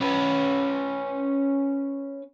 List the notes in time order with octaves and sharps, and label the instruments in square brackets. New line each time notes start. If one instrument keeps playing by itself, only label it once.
[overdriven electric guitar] C#4 B4